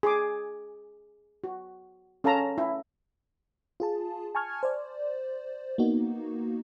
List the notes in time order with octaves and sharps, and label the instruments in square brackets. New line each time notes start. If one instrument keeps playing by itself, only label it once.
[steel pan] G#4 D6
F#4
C#4 A4 F5 A5 A#5
E4
[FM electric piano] F4 G#4 A5
G#5 A5 C#6 F6 G#6
C5 D5
A#3 B3 D#4 F#4